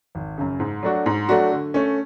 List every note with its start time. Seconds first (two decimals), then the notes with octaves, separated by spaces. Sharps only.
0.15 G#1
0.38 F#2 C#3
0.60 G#2
0.83 F#3 A3 D4 F#4
1.06 G#2
1.29 F#3 A3 D4 F#4
1.52 D3
1.74 A3 C#4